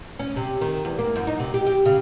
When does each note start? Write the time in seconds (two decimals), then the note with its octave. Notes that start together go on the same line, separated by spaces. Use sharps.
0.19 C#4
0.36 C3
0.61 D#3
0.85 E2
0.98 A#3
1.16 F#2
1.27 D#4
1.39 C3
1.54 G4
1.66 G4
1.86 C#3